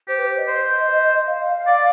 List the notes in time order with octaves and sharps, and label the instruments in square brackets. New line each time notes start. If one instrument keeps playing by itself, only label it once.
[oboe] G4 [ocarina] C5
[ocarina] B4
C5
D#5
[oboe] C5
[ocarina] F5
[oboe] D5